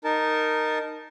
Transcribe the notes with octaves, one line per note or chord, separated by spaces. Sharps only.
D#4 A#4 A5